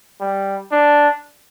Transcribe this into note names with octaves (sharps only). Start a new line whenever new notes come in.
G3
D4